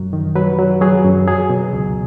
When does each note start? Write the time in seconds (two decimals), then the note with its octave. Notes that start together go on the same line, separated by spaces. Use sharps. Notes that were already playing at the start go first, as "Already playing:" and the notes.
Already playing: F#2 F#3
0.13 D#3
0.35 F#3 B4
0.59 F#3
0.81 F#3 G#4
1.04 F#2
1.27 F#3 G#4
1.50 B2
1.73 C#2